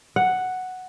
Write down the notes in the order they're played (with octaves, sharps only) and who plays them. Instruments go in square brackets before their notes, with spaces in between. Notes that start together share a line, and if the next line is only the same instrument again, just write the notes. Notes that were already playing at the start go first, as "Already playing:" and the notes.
[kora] F#5